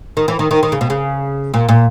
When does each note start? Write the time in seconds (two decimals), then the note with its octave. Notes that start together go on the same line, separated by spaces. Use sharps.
0.17 D#3
0.28 E3
0.39 D#3
0.51 D#3
0.63 D#3
0.72 C#3
0.81 B2
0.90 C#3
1.54 A#2
1.69 A#2